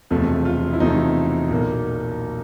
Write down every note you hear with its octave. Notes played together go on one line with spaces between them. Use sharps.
E1 E2 C3 F3 A3
F4
E4
E1 E2 C3 F3 A3 D#4
B1 A#2 F#3 A#3